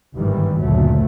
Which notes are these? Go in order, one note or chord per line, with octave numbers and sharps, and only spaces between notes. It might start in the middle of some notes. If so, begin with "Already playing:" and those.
G1 G#2 D#3 E3 G3
F#1 D2 A#2 F#3 A3